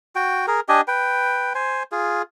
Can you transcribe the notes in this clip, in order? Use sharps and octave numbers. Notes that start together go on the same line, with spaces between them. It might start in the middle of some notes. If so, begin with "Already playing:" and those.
F#4 G5
G#4 A#4
D4 G4 D#5 G#5
B4 G5
C5 G#5
F4 G#4